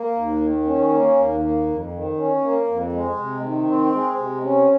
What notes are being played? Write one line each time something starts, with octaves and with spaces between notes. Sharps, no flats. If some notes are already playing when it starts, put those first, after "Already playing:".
Already playing: A#3
D#2
D#3
C#4
A#3
D#2
A#3
F2
D#3
C#4
A#3
F2
G#3
C3
D#3
C4
G#3
C3
C#4